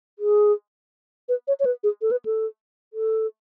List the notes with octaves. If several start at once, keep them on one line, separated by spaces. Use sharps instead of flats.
G#4
B4
C#5
C#5
B4
G#4
A4
B4
A4
A4